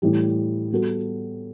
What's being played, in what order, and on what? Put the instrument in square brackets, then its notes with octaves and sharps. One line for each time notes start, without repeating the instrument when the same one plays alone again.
[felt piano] A2 E3 G3
G3 B3 F#4 A4